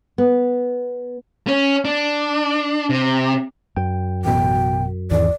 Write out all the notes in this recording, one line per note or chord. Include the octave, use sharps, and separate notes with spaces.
B3
C#4
D4
C3
F#2 G5
A1 B2 G5
G#1 E2 D5